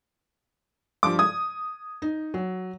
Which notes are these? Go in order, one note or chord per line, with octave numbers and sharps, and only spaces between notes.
G2 F3 D6
D#6 G#6
D#4
F#3